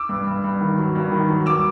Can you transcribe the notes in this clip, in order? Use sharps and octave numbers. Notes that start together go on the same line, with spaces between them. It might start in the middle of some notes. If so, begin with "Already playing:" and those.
Already playing: D6 E6
G2
G2
G2
D#3
F#3
G2
D#3
F#3
G2 D6 E6